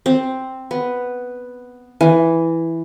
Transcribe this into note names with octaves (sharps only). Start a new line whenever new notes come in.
C4
B3
E3